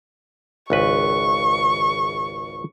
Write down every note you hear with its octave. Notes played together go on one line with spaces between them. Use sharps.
G#1 C#2 B4 C#6